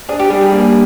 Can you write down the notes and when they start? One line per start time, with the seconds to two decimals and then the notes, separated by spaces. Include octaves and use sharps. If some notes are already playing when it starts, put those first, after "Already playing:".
0.09 D4 G#4
0.19 G4
0.30 G3 G#4
0.41 G#4
0.52 A#3